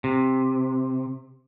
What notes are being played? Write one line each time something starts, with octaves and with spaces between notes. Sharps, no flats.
C3